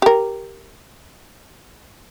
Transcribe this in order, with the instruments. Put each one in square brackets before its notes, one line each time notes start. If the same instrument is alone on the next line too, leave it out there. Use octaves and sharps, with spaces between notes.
[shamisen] G4 A#4